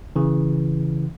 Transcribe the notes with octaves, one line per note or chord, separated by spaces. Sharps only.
C#3 E3